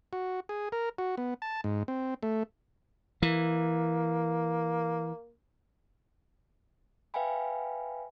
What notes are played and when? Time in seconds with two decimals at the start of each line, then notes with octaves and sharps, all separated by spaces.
0.13 F#4
0.49 G#4
0.72 A#4
0.98 F#4
1.17 B3
1.42 A5
1.64 G#2
1.88 C4
2.23 A3
3.22 E3 A#3
7.14 B4 E5 F5 G5 G#5 B5